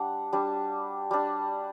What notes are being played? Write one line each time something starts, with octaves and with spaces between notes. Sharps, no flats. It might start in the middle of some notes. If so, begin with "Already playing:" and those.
Already playing: G3 D4 F#5
G3 D4
G3 D4